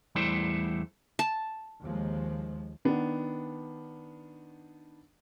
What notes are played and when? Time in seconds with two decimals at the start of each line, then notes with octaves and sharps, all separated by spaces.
0.15 E2 G3 A3 E4 A4 C5
1.19 A5
1.82 D#2 F3 G#3
2.85 D#3 B3 D4